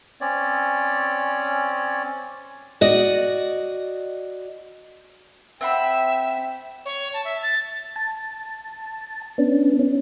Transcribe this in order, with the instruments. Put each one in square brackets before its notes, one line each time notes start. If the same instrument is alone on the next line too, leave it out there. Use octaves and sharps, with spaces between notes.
[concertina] C4 C#4 C#5 D5
[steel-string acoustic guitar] F#4 D5 D#5
[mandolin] C4 F#5 B5 [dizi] E5 [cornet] G5
[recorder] C#5
A5
E5
A6
[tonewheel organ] A5
B3 C#4 D4
C#4